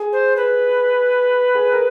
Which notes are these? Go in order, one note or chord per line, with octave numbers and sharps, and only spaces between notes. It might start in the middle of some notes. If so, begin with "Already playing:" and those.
Already playing: G#4
C5
B4
G#4
A#4